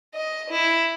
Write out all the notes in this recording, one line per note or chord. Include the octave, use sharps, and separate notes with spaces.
D#5
E4